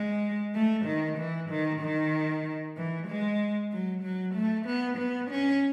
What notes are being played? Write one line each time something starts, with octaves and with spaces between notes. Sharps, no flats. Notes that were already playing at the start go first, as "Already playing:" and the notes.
Already playing: G#3
A3
D#3
E3
D#3
D#3
E3
G#3
F#3
F#3
A3
B3
B3
C#4